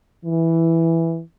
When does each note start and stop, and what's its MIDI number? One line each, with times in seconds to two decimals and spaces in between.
0.24 1.21 52